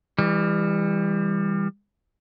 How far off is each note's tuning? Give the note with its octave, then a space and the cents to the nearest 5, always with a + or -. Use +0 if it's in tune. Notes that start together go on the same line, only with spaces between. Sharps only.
E3 +0 G3 +30